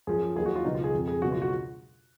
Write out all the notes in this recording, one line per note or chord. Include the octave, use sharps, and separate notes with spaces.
F#2 F3 G#4
D#2 D#3 F#3 G#4
F#4
F4
C#2 B2 F#3 D#4
F4
G#4
F2 F3
G#4
C#2 B2 F#3 F#4
F4
F#4